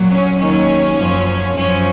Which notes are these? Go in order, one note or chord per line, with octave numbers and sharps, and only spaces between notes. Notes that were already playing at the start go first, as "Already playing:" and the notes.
Already playing: A#2 F#3
C#4
D#2 D#3 F#3 C#4
F#2 F3
F#2 F3 C#4